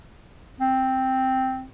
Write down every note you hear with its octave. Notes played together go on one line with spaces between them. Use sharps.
C4